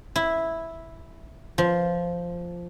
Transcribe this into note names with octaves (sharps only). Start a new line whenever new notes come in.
E4
F3